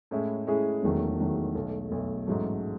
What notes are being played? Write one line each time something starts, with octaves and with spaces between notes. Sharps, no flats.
A2 G#3 C#4 E4 G#4
A2 G#3 C#4 E4 G#4
E1 E2 D#3 F#3 A3
E1 E2 D#3 F#3 A3
B1 B2 A3
B1 B2 A3
A1 G#2 F#3 A3